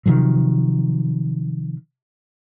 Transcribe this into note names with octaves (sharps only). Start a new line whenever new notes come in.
C3 D#3 F3 F#3